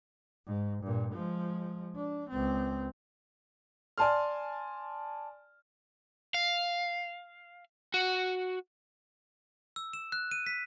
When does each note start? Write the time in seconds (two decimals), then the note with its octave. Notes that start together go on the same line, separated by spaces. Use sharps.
0.47 G#2
0.83 G2 A#2
1.13 F3 G#3
1.96 D4
2.30 C#2 C4
3.98 D5 G#5 A5 C6 F6
6.34 F5
7.94 F#4
9.76 E6
9.93 E7
10.12 F#6
10.31 D#7
10.46 B6